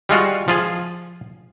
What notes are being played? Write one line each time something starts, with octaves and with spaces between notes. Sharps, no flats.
G3 G#3 F4 F#4
F3 F4 G#4